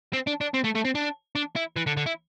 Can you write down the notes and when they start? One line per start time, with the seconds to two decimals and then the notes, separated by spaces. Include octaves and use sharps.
0.13 C4
0.27 D4
0.41 D4
0.54 C4
0.64 A3
0.75 A3
0.85 C4
0.95 D4
1.35 D4
1.56 E4
1.77 E3
1.87 D3
1.97 D3
2.06 E4